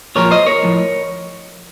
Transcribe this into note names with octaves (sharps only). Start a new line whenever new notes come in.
A#2 F3 A#4 C#5
C5 D#5
A#4 C#5
A2 F3